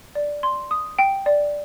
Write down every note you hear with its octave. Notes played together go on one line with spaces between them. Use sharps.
D5
C6
D#6
G5
D5